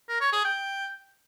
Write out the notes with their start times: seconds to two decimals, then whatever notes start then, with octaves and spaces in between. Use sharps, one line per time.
0.09 A#4
0.21 C#5
0.32 G#4
0.44 G5